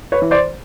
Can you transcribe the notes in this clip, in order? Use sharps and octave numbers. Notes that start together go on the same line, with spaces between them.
B4 C#5
E3
C5 D5